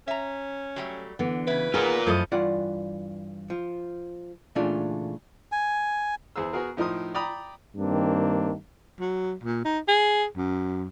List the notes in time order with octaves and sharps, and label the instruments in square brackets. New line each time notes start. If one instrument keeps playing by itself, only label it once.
[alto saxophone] C#4 [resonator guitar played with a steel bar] E5 A#5
[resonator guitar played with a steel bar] F#3 G3 A3
[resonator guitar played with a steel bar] D3 [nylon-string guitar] E3 B3
[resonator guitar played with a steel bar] C#3 E4 [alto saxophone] B4
[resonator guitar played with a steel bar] D#3 B3 [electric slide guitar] F4 A#4 [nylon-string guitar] G#4
[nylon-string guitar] F#2 A3 [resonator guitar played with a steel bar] E3 A4 D#5 [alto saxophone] F3
[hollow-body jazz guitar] G2 E3 F4 D5 F#5
F3
A#2 C#3 E3 A3 D4 F4
[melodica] G#5
[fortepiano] E2 G#4 C5 E6
B3 F#4 G#4 A#4
A2 F3 D#4 A#4 C6 D#6
D5 G5 A#5 B5 D#6
[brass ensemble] G2 D#3 A#3 C4 D4
[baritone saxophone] F#3
A#2
D#4
G#4
F#2